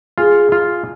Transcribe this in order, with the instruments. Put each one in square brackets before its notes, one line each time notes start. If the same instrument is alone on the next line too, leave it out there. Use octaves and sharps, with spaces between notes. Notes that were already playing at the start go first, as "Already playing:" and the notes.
[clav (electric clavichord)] F4 [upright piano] G#4
[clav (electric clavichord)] F4